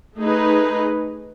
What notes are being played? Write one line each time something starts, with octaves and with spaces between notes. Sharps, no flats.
A3 D#4 G#4 B4